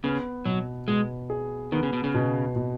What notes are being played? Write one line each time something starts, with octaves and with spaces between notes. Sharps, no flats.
C#3 B3
B2 F#3
B2 G#3
G#4
D#3 B3
C#3
B2
C#3
B2
B2